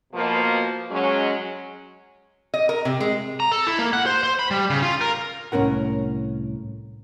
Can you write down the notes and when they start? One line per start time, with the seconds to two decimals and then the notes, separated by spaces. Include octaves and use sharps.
0.13 B2 F3 A#3
0.90 F#3 G#3 C#4
2.54 D#5
2.69 A#4
2.85 C3
3.01 G#3
3.40 A#5
3.52 A4
3.67 E4
3.79 A#3
3.93 F#5
4.06 C5
4.23 C5
4.39 B5
4.51 G3
4.70 C#3
4.82 F4
5.01 A#4
5.52 C2 A2 C#4 A#4 F#5